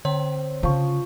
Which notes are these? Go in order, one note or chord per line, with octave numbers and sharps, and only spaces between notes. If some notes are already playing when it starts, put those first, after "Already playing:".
D3 C4 C#5
C#3 F3 C#6